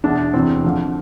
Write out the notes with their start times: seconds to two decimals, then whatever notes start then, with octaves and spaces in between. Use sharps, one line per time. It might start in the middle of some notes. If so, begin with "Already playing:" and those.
0.04 E2 B2 D4
0.33 E2 C3 E3 C4
0.64 F2 D3 F3